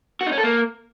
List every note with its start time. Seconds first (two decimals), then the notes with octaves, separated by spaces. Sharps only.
0.21 F#4
0.26 D#4
0.32 C#4
0.38 A4
0.43 A#3